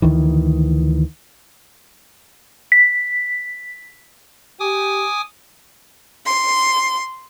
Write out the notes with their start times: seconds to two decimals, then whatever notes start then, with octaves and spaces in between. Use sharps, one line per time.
0.02 D2 D#3 E3
2.72 B6
4.60 G4 G#5 D6 D#6
6.25 C6